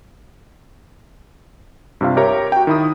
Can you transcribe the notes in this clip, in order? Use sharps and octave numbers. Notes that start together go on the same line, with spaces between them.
G2 C3 F4 F5
G4 A#4 C#5 E5 A#5
F#4 G5
D#3 E4 D#6